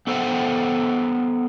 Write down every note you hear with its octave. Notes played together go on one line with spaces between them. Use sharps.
B3 A4 C5 E5 F#5 G5